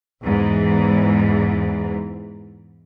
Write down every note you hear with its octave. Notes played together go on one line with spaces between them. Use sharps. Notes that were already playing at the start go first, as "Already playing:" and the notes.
E2 G#2 E3